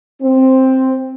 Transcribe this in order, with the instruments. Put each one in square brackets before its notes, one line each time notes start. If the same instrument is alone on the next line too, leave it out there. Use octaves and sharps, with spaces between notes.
[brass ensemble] C4